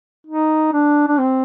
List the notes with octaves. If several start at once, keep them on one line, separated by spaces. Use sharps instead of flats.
D#4
D4
D4
C4